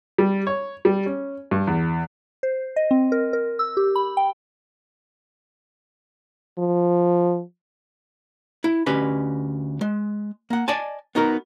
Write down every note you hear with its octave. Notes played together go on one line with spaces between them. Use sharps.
G3
C#5
G3
C#4
G2
E2
C5
D#5
C4
A#4
A#4
E6
G4
B5
G5
F3
E4
D2 C#4 G4 B4 D#5
G#3
A#3 F#5
D5 D#5 G#5 A5
B3 D#4 F#4 A#4